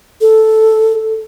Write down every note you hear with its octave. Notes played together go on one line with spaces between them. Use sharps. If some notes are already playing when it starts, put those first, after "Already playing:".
A4